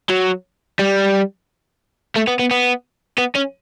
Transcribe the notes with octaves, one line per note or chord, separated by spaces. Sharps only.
F#3
G3
A3
B3
B3
B3
B3
C#4